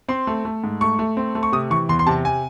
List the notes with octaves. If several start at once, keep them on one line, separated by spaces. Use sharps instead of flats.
C4 C6
A3
A3
G#2
A3 C#6
A3
C4
A3
C#6
C3 D#6
E3 C#6
E2 C6
C6
C3 A5
G#5